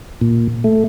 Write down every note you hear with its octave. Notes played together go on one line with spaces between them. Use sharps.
A#2
A3